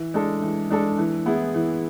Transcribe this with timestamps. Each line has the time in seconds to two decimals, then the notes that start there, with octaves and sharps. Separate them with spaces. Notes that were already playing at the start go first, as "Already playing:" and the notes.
Already playing: E3
0.14 G#3 D4 A4
0.42 E3
0.70 G#3 D4 A4
0.98 E3
1.26 B3 E4 G#4
1.54 E3